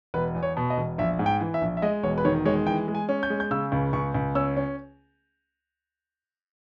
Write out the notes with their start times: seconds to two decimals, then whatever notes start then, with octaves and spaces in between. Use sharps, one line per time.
0.14 E1 B4
0.35 E2
0.43 C#5
0.57 B2
0.70 D#5
0.78 E1
0.98 A#1 E5
1.19 G#2
1.26 G5
1.41 E3
1.54 E5
1.61 A#1
1.77 E5
1.82 G#3 D#5
2.03 E1 C#5
2.18 B4
2.25 D#3 C#5
2.45 G#3 C#5
2.66 E3 G5
2.88 G#3
2.95 G#5
3.09 C#4
3.23 G6
3.30 G#3
3.40 G6
3.51 C#3 E6
3.72 C#2
3.93 C#2 C#6
4.14 C#2
4.35 C#4 E6
4.57 C#4